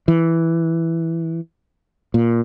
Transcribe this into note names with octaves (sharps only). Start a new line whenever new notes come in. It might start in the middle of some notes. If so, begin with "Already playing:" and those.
E3
A#2